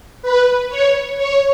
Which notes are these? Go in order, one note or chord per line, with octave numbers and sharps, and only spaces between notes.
B4
C#5
C#5